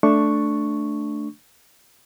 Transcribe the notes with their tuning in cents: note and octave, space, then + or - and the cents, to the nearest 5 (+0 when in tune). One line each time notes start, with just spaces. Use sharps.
A3 +0 D4 +0 C#6 +0